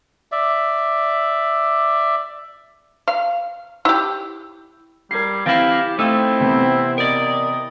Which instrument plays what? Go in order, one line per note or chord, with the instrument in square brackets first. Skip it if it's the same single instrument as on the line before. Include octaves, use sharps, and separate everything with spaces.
[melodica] D5 E5
[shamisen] F5
E4 G4
[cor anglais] G3 [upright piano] A#4 G#6 C7
[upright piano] E3 A6 A#6 [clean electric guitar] C4 E4 [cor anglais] G4 [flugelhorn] F5
[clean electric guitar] A3 D#4 [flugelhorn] C4 [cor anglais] E4 [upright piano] F5 E6
[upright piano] C3 E3 B3
[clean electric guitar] A#4 D5 [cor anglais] D#5